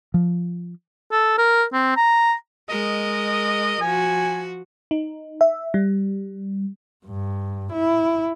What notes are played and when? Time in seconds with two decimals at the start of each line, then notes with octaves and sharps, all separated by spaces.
0.14 F3
1.12 A4
1.38 A#4
1.73 C4
1.97 A#5
2.69 G#3 A#4 D#5
3.81 F3 F#4 G#5
4.91 D#4
5.41 E5
5.74 G3
7.06 G2
7.72 E4